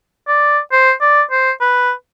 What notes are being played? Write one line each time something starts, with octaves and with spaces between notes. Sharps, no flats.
D5
C5
D5
C5
B4